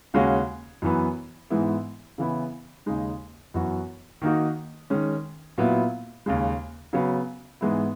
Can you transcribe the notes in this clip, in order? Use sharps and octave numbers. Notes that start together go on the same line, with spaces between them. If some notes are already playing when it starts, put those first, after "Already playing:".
D#2 C#3 G#3 C#4 F#4
F#2 E3 B3
G#2 E3 G#3 B3 E4
C#3 E3 B3 E4
D#2 C#3 G#3 D#4
F#2 E3 B3 F#4
D#3 A#3 D#4 F#4
D#3 G#3 C#4
A#2 F#3 B3 E4
D#2 C#3 G#3
C#3 F#3 B3
G#2 E3 G#3 B3 E4